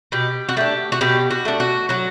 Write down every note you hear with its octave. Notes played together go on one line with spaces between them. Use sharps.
B2 G4
F#4
A3 D4 G4
F#4
B2 G4
F#4
A3 D4
F#4
F#3 F#4